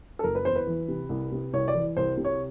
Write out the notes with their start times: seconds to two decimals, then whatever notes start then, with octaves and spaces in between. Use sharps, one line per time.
0.19 A4
0.24 F#1 A#4
0.35 B4
0.45 E2 C5
0.56 B4
0.67 E3
0.88 C3
1.09 C2
1.32 C3
1.53 C2 C#5
1.68 D5
1.75 E3
1.97 C2 C5
2.17 C3
2.25 C#5